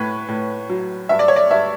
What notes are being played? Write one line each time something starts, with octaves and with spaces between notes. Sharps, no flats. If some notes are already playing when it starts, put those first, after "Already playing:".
Already playing: A2 B4 C#5
A2
F#3
G2 E5
D5
C#5
D5
G2 E5